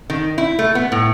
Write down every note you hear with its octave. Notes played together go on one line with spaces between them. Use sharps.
D#3
E4
A3
B3
A2